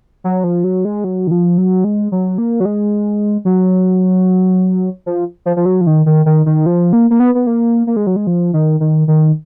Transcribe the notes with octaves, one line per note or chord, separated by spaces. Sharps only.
F#3
F3
F#3
G#3
F#3
D#3
F3
F#3
G#3
F#3
A#3
F#3
G#3
F#3
F3
F3
F3
F#3
F3
D#3
D#3
D#3
D#3
F3
A#3
A#3
B3
B3
A#3
A#3
G#3
F#3
G#3
F3
D#3
D#3
D#3